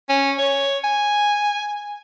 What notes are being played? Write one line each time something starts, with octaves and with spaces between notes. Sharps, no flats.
C#4
C#5
G#5